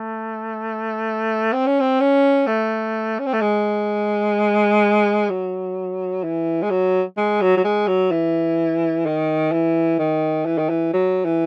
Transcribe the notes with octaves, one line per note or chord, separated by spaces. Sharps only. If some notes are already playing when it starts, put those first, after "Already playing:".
Already playing: A3
C4
C#4
C4
C#4
A3
C#4
C4
A3
G#3
F#3
E3
G#3
F#3
G#3
F#3
F#3
G#3
F#3
E3
D#3
E3
D#3
E3
D#3
E3
F#3
E3